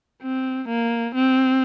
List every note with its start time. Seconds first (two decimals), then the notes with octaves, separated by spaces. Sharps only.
0.22 C4
0.68 A#3
1.15 C4